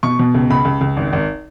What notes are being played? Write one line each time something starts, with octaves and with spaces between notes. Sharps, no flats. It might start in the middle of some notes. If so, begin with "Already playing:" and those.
B2 C#6
B2
C#2
C#2 B5
C#2
C#2
G#1
G#1